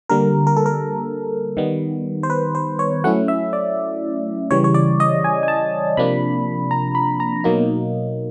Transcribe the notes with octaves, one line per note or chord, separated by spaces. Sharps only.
D3 G3 A#3 A#4
A#4
A4
A#4
D#3 G3 B3
C5
B4
C5
C#5
F#3 A3 C#4 E4 F#5
E5
D5
C#3 E3 G3 C#5
C#5
D5
D#5
G#5
G#5
A5
C3 F3 A#3 D4 B5
A#5
B5
A#5
B2 F#3 A#3 D#4